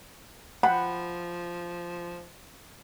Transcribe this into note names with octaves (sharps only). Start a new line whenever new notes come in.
F3 F#5 G5 B5